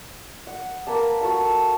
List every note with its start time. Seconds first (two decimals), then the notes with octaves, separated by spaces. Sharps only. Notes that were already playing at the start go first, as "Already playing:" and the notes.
0.47 F#5
0.87 A#3 B4 A5
1.21 F#4 A4 F5